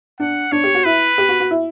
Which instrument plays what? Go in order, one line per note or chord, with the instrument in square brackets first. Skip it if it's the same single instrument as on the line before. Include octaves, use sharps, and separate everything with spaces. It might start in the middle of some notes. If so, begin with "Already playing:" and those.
[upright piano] D4 [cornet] F#5
[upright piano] D4 [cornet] C#5
[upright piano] G4
F#4
[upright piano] E4 [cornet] B4
[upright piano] G4
F#4
F#4
E4